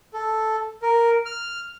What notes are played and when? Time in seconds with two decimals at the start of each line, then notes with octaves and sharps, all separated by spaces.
0.13 A4
0.82 A#4
1.26 F6